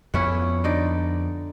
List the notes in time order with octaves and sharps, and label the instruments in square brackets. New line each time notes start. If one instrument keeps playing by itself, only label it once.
[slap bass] F2 B3 [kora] C#4 E4 F#5
[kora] D3 D#4 D5